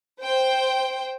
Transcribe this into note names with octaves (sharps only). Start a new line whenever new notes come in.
C5 G5